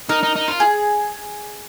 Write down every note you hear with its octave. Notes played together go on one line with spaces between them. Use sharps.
D#4 A#4
D#4
D#4
F4
G#4